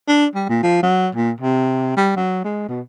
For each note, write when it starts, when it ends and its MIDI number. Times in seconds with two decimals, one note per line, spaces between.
0.08 0.26 62
0.35 0.45 55
0.49 0.61 46
0.63 0.82 53
0.83 1.08 54
1.15 1.31 46
1.41 1.96 48
1.97 2.12 55
2.16 2.40 54
2.44 2.65 56
2.69 2.81 47